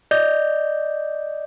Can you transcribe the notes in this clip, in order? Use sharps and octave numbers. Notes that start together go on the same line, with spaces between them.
D5 D#5 G6